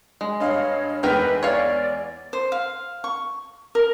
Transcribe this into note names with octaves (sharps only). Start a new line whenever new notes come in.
G#3
G2 C#5 D#5 F5
E2 G#3 D#4 A#4 B4 G5
C#5 D5 F5
C5
F5
C#6
A#4